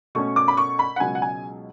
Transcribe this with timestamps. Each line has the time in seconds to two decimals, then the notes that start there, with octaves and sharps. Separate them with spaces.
0.15 B2 A3 C#4 C#6
0.36 D6
0.48 B5
0.57 C#6
0.79 B5
0.96 F#5
1.00 C#2 B2 F#3 C#4 G#5
1.15 F#5
1.22 G#5